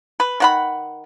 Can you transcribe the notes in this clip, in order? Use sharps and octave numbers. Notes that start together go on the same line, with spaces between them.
B4
D#3 F#5 B5